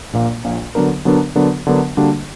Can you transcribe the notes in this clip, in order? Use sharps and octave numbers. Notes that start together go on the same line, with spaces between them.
A#1 A#2 A#3
A#1 A#2 A#3
D3 F#3 B3 D4 A#4
D3 F#3 B3 D4 A#4
D3 F#3 B3 D4 A#4
D3 F#3 B3 D4 A#4
D3 G3 A#3 D4 F#4